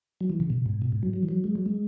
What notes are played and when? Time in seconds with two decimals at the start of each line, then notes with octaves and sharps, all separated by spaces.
0.21 F#3
0.30 E3
0.40 C#3
0.50 B2
0.66 G#2
0.82 B2
0.92 G#2
1.03 F#3
1.13 F#3
1.23 E3
1.29 F#3
1.44 G#3
1.55 F#3
1.66 G#3